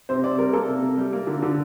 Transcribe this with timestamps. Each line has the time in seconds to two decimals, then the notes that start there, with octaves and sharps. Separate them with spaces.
0.09 C3 C5
0.23 C3 D5
0.38 G3 A#4
0.49 A#4
0.53 A#3 A4
0.68 C3
0.82 C3
0.97 G3
1.13 A#3
1.27 D3
1.42 D3